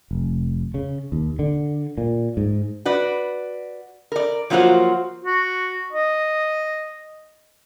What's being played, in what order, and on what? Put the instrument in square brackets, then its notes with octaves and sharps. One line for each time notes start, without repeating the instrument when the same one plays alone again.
[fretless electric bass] F1
C#3
D#2
D3
A#2
G#2
[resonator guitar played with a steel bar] F#4 B4 D5
A#4 D5
F3 F#3 A#3 F4 F#4 C5
[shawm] F#4
D#5